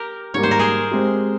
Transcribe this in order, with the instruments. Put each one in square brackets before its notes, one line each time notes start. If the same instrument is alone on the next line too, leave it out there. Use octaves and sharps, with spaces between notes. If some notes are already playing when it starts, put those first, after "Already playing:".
Already playing: [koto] G4 A#4
[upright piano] G#2 G3 A#3 [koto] C#5
[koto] C5
A#4
G#4 C5
[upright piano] G#3 C4 G4